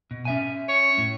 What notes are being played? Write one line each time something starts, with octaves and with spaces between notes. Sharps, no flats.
B2
C#4 E5 G#5
C#5
A2